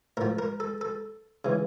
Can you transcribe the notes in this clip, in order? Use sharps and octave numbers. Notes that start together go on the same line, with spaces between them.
A2 F3 A#4
A#4
A4
A4
C#3 E3